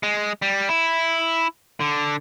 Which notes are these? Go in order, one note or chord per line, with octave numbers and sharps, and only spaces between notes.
G#3
G3
E4
D3